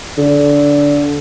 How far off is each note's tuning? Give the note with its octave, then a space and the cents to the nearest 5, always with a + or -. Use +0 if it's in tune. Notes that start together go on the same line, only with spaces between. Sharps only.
D3 -20